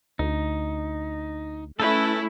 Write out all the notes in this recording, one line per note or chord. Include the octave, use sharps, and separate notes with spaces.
D2 D#4
A3 C#4 E4 A4 B4